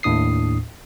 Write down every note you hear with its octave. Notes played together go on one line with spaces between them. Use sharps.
D#2 A2 D4 D#6 C7